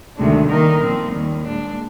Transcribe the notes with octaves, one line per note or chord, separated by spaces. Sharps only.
D2 C3 D#3 G#3 D4
D#3 G3 A#3 D#4 A#4
A#2 F3 C4
D#2 D#3 G3
A#2 G#3 D4